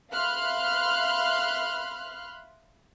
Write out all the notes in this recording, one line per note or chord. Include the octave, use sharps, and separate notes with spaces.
E5 F5 B5 C6 F6 F#6